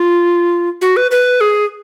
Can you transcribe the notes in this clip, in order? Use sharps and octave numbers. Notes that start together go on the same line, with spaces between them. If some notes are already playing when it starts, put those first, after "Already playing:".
Already playing: F4
F#4
B4
B4
G#4